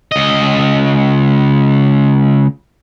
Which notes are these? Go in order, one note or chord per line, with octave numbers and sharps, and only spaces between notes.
C#2 D#5